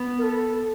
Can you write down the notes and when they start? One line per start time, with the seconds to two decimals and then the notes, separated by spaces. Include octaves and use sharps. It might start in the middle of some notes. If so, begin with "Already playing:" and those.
Already playing: B3
0.18 A#4
0.23 A4